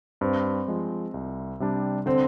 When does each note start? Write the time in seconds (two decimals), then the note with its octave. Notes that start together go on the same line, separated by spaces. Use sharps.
0.21 G2 C4
0.68 F3 G#3
1.14 C2
1.60 C3 G3 D4
2.06 D3 C4